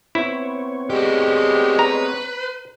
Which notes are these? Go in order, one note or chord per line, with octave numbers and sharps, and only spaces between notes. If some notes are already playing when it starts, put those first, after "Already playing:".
B3 C4 E4 C#5
A2 G3 G#3 F#4 G4
B4 A#5